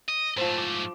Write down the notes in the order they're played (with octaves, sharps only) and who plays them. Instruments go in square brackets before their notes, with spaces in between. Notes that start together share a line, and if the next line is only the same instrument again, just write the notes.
[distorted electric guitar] D#5
[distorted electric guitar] G#2 A3 [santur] F3 C5
[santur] D6